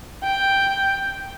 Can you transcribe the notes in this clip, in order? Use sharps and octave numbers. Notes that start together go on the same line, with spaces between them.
G5